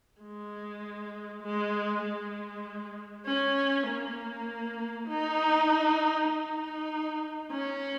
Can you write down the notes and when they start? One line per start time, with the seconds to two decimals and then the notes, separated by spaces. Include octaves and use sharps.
0.21 G#3
1.43 G#3
2.03 G#3
3.26 C#4
3.87 A#3
5.08 D#4
6.29 D#4
7.52 C#4